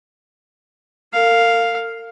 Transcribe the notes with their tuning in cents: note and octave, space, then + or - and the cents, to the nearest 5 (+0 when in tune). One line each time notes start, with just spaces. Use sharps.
A#4 -40 F5 +0